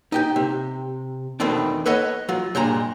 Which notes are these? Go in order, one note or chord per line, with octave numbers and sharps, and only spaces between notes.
D#4 G4 G5
C3
E2 B2 D#3 A3 C4 D4
A4 B4 C#5 D#5 F#5
F#3 F4
G2 A#2 G#3 A#5